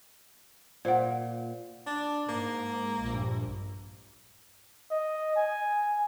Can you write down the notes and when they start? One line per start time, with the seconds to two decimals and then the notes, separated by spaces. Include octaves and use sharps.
0.85 A#2 C5 F#5
1.87 D4
2.29 G#2 A#3
3.02 A#1 G2
4.91 D#5
5.36 G#5